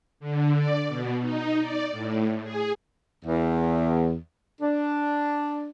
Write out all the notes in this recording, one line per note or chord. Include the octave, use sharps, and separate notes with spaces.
D3
D5
B2
D#4
D5
A2
G#4
E2
D4